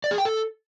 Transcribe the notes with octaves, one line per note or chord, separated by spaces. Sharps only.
D5
G#4
G5
A4